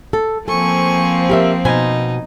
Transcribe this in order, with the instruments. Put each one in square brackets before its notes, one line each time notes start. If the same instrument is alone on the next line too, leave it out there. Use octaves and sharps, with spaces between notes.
[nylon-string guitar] A4
[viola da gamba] F3 A#3 C4 [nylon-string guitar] A4 [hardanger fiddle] G#5 C#6
[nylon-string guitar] G4 A#4 E5
[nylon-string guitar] B2 C5 G#5 [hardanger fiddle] D#4